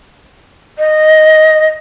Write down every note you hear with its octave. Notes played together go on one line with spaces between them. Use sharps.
D#5